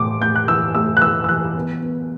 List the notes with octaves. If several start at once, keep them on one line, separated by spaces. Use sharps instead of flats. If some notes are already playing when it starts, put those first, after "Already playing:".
Already playing: A2 E3 A3 C6 D6
A3 G6
F#6
E3 E6
A3 E6
F#6
E3 E6
E6
E3 F#6
B3
B3